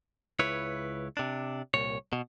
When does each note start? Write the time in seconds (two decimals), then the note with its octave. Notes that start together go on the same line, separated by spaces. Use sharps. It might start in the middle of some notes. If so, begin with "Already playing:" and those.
0.39 C#2 E4 B4 C#5
1.17 C3 D4
1.74 C2 A#2 C#5
2.13 B2